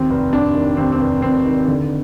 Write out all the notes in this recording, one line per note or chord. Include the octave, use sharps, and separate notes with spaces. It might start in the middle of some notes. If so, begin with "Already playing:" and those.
Already playing: D#2 C4
F1
F1 D4
D#3
D#2 C4
C4
F1
F1 C4
D#3
D3